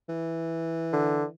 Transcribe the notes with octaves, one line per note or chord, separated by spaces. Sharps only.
E3
D3